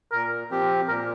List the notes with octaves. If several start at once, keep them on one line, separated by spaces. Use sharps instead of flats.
A#2 A#4
F3 C4 G4
A#2 A#4